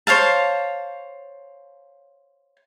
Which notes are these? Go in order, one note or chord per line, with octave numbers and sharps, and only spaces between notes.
C5 C#5 F5 A5